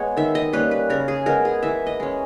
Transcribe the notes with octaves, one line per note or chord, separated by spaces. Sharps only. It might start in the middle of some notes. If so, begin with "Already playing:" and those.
Already playing: G#3 B3 C#5
D#3 E5
D#5
G3 A#3 C#4 B4
B4
C#3 A#4
G#4
G#3 B3 A#4
G#4
E3 E5
D#5
G#3 C#4